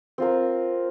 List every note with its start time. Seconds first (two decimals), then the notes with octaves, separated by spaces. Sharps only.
0.18 C4 F4 A#4